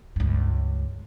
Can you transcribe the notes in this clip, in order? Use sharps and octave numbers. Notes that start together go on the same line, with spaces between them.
C#2 G2